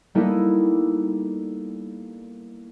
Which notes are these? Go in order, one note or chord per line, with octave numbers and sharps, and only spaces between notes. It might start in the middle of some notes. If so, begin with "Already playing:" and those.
G3 A#3 B3 D#4 E4 A4